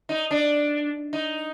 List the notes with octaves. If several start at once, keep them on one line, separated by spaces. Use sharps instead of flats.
D#4
D4
D#4